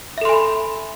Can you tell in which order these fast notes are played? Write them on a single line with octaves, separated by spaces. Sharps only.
E5 A4 C6 G#5 B5